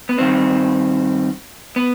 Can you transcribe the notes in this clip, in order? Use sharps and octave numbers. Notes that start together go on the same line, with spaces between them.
B3
G2 D#3 G3 C4
B3